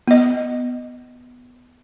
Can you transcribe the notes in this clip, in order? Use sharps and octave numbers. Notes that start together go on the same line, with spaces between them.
B3 D#5